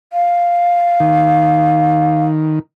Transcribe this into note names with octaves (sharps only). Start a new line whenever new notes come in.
F5
D#3